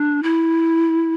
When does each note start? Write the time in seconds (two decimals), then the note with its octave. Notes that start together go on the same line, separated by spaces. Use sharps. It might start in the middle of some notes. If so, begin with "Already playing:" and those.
Already playing: D4
0.23 E4